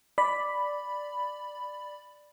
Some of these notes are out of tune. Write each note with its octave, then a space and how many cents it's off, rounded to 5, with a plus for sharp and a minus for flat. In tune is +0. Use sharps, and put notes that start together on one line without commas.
D5 +0 B5 +0